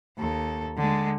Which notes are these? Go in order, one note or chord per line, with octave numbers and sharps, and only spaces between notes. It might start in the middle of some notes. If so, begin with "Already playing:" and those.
D#2 A4
D3 G#3